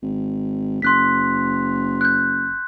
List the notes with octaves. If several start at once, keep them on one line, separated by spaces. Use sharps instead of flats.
G#1
F#1 C6 F#6 B6
F#6 G6